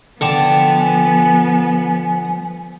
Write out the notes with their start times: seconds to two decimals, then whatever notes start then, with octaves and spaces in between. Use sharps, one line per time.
0.21 D3 F3 B3 D5 G5 A5
0.78 G#5